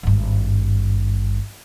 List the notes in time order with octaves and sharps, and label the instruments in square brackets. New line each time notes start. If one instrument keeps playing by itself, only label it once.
[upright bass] G#1 G2